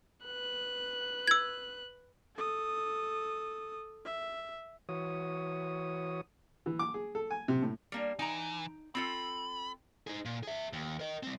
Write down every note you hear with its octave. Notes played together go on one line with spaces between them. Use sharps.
B4 F#6
E6 G#6
A4 D#6
E5
E3 F#4 C#5 D#6
E3
D6
G#4
A4
G#5
C3
A2
G3 A#3 D4
E3 D#4 G5 A#5
C4 F4 A4 B5
D#4 G#4
A#2
G#4 E5
D#2
A#4 D#5
G3 C4